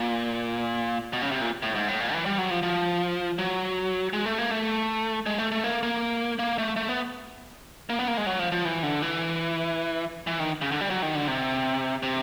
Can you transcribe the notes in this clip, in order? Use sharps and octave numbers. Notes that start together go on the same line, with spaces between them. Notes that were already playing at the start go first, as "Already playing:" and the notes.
Already playing: A#2
B2
C#3
C3
A#2
A2
G#2
A2
A#2
E3
G3
F#3
F3
F3
F#3
G#3
A3
A#3
A3
G#3
A3
A3
A#3
A#3
A#3
A3
A3
B3
A#3
B3
A#3
G#3
F#3
F3
F3
E3
D3
E3
E3
D#3
C#3
D3
G3
F#3
D#3
D3
C3
C3